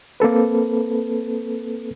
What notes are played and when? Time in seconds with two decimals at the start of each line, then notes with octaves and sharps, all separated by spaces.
0.20 A#3 C4 A4 B4